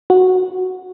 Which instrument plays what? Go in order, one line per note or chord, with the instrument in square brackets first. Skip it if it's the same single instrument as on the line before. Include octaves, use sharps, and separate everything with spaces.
[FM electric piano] F#4